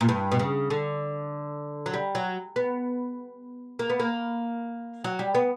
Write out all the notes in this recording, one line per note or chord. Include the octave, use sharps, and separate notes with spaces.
A#2
G2
B2
C#3
D3
F#3
G3
F#3
B3
A#3
B3
A#3
F#3
G3
B3